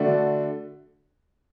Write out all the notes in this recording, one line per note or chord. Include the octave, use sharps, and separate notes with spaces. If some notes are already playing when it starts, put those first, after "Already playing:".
Already playing: D3 A3 D4 F#4